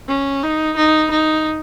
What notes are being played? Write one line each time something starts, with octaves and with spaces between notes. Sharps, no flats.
C#4
D#4
D#4
D#4